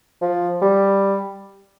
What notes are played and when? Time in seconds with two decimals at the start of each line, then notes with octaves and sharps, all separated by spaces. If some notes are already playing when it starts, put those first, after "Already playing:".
0.22 F3
0.62 G3